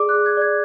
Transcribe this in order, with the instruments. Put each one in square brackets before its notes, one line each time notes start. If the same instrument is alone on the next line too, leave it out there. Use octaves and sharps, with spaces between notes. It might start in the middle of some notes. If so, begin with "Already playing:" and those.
Already playing: [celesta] G#4 D5 D6
F#6
G#4
G#6
D5 G#6